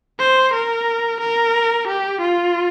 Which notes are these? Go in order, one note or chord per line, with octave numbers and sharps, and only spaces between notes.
C5
A#4
A#4
G4
F4